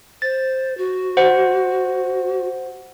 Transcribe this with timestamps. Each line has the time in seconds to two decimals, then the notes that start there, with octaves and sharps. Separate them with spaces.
0.22 C5 A6
0.78 F#4
1.17 C5 F#5